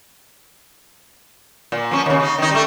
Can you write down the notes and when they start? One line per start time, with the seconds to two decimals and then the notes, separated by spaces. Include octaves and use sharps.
1.72 A#2
1.91 F3 C#4
2.06 D#2 C#3
2.20 C#3 D#4
2.38 D#3 D#4
2.51 G3 A3